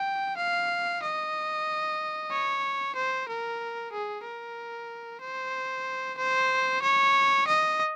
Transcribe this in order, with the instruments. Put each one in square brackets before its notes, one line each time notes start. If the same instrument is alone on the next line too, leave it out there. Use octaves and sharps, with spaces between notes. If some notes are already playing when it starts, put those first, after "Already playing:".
Already playing: [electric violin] G5
F5
D#5
C#5
C5
A#4
G#4
A#4
C5
C5
C#5
D#5